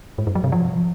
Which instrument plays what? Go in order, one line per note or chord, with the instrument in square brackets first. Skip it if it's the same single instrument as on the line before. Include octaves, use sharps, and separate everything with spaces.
[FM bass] G#2
G2
F#3
C3
F3